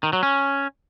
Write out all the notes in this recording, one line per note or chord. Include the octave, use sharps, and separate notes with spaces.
D#3
F#3
C#4